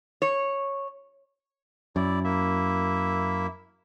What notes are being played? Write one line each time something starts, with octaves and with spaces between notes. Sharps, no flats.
C#5
F#2 E4 D5
A#3 E4 E5